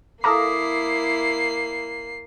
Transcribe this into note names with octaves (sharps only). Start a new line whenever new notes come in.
A#3 E4 A4 F5 A#5 D6 D#6 C7